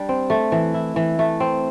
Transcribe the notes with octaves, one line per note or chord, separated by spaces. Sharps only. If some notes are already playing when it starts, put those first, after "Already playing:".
Already playing: G3 D4
C4
A3
E3
E4
E3
A3
C4